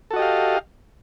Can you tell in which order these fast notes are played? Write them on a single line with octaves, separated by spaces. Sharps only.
A4 F#4 D#5 G4 F5